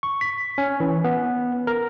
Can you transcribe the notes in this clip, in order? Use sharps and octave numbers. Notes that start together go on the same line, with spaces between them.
C#6
B6
C#4
E3
B3
A#4